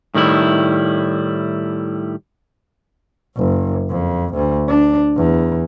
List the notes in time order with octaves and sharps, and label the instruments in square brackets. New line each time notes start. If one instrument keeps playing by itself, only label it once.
[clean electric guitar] A2 D#3 G3 E4
[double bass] F#1
F2
D2
D4
E2